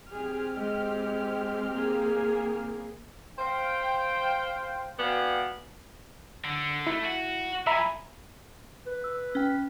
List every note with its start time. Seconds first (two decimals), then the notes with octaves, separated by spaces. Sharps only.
0.12 C4 G4 G#4 F6
0.55 G#3
1.75 A#3 G#4
3.39 C5 F5 G5
4.99 B3 F#4 D5 F5 G5 G#5
6.44 D3
6.87 A3 E4
7.05 F#4
7.67 F3 E5 G#5 A#5 B5
8.87 B4
9.04 E6
9.35 C#4 G5